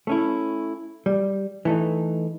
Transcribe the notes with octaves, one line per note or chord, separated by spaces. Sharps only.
A3 C#4 E4
G3
E3 A3 D#4